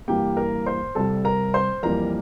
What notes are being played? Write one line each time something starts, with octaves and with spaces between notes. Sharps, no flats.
G2 E3 A#3 G4 G5
A#4 A#5
C5 C6
C2 C3 G3 A4 A5
A#4 A#5
C5 C6
F2 E3 G3 A#3 A#4 A#5